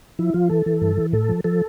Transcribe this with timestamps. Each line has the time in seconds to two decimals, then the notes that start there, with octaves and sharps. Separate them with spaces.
0.19 F3 E4
0.34 F3 F4
0.49 E3 A4
0.66 E3
0.81 G2
0.97 E3
1.13 A2 A4
1.29 F3
1.44 F3 A4